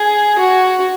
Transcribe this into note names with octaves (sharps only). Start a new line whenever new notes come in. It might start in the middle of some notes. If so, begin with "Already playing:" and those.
Already playing: G#4
F#4